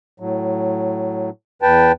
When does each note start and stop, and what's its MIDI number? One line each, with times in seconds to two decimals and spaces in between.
0.20 1.30 45
0.20 1.30 54
1.62 1.92 40
1.62 1.92 71
1.62 1.92 79
1.62 1.92 81